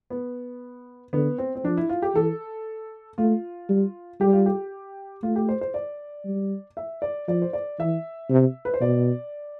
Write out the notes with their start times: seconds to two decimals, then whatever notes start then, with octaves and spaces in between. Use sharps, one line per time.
0.10 B3
1.13 D3 B3
1.38 C4
1.55 C4
1.64 F3 D4
1.77 E4
1.89 F4
2.02 G4
2.15 E3 A4
3.18 A3 F4
3.69 G3
4.21 G3 G4
4.33 F4
4.46 G4
5.23 A3 F4
5.36 G4
5.49 C5
5.61 C5
5.74 D5
6.25 G3
6.77 E5
7.02 D5
7.28 F3 D5
7.42 C5
7.53 D5
7.80 E3 E5
8.30 C3
8.65 B4
8.74 C5
8.81 B2 D5